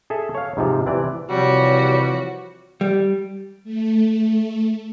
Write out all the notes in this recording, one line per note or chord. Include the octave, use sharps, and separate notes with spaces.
G#4 A4 E5
C#5 F5
G#2 C3 F3
C3 E3 D5
C3 E3 F3 G3 F#4 C#5
G3
A3